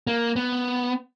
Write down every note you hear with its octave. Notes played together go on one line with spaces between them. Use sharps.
A#3
B3